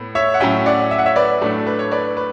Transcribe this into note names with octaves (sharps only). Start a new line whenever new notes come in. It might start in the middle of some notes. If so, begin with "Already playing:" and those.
Already playing: A2 B3
C#5 E5
F#5
A2 F#3 C#4 E5 G5
D5 F#5
E5
F#5
C#5 E5
B4 D5
A2 F#3 A3 D4
B4
C#5
B4 D5
B4